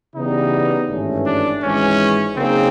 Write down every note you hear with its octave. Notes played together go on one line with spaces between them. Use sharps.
C#3 E3 G3 B3 D#4
G#1 G2 E3 A3 C#4
D4
G#1 G#2 E3 G#3 C#4
C#3 F#3 A#3 C4 D#4 G#4